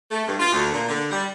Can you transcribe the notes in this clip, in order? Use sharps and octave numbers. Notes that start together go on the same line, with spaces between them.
A3
G2
F4
D2
A#2
D3
G3